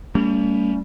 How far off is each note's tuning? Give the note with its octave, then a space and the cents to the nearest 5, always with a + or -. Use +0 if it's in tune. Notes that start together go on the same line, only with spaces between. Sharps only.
G3 +15 A#3 -40 C#4 +40